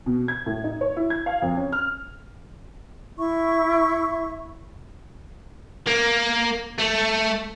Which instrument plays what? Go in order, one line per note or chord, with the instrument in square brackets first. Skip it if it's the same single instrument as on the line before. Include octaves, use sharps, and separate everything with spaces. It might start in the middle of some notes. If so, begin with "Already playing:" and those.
[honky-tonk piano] B2
G#6
A2
D#4
C#5
E4
G#6
F5
F2
C#4
F6
[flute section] E4 E5 C#6
[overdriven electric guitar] A#3
A3